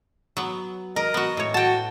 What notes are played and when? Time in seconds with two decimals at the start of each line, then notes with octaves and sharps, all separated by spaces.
0.37 F#3 B3
0.96 A#4 D#5
1.14 B3 F#4
1.37 A2 C#5
1.54 F#4 G5 A5